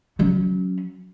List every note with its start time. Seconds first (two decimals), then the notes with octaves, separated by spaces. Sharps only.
0.19 F#3 C#4